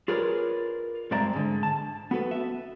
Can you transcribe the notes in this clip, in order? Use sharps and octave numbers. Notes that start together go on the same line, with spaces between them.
F4 G#4 A#4 B4 C#5 D5
G2 G#3 C4 D5 E5 A#5
G#2 D3
A5
B3 F#4 A4 B4
E5